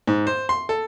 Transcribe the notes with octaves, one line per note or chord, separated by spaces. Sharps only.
G#2
C5
C6
A4